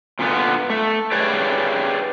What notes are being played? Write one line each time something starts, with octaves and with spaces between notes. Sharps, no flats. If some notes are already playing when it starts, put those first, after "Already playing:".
A#2 D3 B3
A3
G4 G#4 B4 C#5 D5